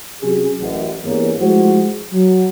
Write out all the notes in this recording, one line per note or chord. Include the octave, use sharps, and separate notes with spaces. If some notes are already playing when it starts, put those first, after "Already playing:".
C3 F#3 C#4 G4 G#4
A1 F#2
E2 G2 A#3 C#4
F3 G#3 A3 E4 F#4 C5
F#3